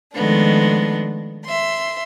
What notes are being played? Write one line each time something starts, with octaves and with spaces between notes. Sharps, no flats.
D#3 F3 G#3 A3 B3 D4
E5 C6